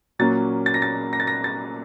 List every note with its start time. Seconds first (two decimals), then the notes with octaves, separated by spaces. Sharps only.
0.19 A#2 F#3 A#3 C#4 A6
0.66 A6
0.74 A#6
0.82 A6
1.13 A#6
1.20 A6
1.27 A#6
1.44 A6